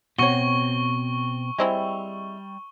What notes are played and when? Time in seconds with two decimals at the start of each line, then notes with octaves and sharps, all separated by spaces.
0.18 B2 C4 F#4 C#5 C#6 G7
1.58 G3 G#3 C4 E4